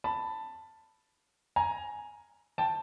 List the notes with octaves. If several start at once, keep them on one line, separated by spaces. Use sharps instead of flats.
A5 B5
G#5 A#5
G5 A5